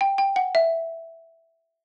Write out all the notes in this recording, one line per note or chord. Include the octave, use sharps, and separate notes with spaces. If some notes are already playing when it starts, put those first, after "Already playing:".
G5
G5
F#5
E5